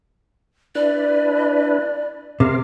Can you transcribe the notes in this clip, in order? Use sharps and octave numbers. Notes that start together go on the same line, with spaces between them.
D4 E4 B4 D5
C3 A#4 F5